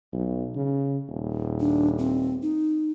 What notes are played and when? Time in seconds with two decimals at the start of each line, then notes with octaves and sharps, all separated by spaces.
0.13 B1
0.55 C#3
1.09 D#1
1.60 D4
1.98 C4
2.42 D#4